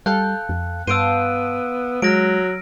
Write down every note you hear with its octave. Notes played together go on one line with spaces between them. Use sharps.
G3 A4 F5 G5 F#6
F2
G2 B3 C5 F5 A5 E6 D7 D#7
F#3 G#3 F6 A#6 D7